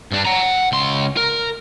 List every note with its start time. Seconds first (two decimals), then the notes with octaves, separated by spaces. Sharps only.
0.12 G2 D4
0.25 F#5 A#5
0.72 C#2 C6
1.17 A#4